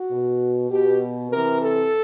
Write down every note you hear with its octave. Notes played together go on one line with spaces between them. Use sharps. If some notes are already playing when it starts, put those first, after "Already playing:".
Already playing: F#4
B2
B2 G4
C3 E3 A#4
A4